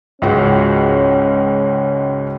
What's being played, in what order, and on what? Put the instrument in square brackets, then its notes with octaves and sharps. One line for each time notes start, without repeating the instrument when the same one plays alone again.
[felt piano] C#2 G#2 F#4 [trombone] C#4